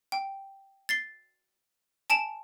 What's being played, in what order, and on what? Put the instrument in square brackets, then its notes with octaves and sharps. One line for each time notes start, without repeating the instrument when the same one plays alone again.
[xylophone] G5
A6 C7 G7
G#5 A5 D7 E7 F7